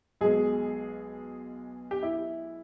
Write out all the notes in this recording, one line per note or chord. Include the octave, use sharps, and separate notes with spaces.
B1 B2 G#3 G#4
G4
E4